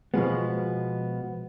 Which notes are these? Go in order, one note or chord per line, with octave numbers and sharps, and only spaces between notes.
B2 F3 G#3 B3